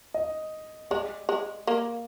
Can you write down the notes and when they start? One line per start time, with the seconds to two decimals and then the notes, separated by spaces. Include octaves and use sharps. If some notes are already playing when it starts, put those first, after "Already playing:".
0.14 D#5
0.91 G#3 D5
1.29 G#3
1.67 A#3